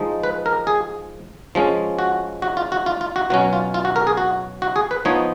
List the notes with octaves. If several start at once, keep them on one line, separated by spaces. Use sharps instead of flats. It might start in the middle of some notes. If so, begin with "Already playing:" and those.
Already playing: F3 G#3 D#4
B4
A#4
G#4
F3 G#3 C#4
F#4
F#4
F4
F#4
F4
F4
F#4
B2 F#3 C#4 F#4
F4
F4
F#4
A#4
G#4
F#4
F#4
G#4
B4
F3 B3 D#4 C#5